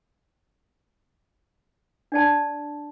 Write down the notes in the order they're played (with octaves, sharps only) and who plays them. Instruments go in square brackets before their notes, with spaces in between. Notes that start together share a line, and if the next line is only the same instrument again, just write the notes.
[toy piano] D4 D5 A5